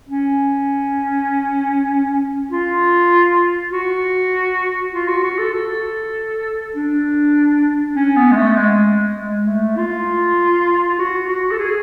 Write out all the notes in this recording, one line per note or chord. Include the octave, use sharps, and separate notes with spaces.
C#4
F4
F#4
F4
F#4
F#4
A4
A4
D4
C#4
B3
G#3
A3
G#3
G#3
A3
F4
F4
F#4
F#4
A4
G#4